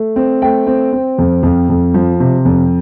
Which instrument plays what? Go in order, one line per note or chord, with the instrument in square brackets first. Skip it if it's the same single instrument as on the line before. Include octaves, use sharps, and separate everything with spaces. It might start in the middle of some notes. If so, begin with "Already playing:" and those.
Already playing: [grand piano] A3
C4
A3 G5
C4
C4
F2
F2
F2
F3
C3
F2